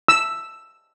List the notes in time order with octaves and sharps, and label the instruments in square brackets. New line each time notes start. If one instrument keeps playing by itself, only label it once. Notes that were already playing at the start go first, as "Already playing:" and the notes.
[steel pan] E6